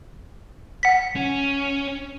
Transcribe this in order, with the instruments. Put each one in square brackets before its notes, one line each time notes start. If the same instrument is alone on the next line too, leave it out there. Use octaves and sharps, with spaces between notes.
[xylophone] F#5 B6
[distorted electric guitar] C#4